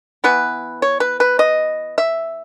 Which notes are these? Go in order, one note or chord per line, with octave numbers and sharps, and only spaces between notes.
E3 B3 B4
C#5
B4
B4
D#5
E5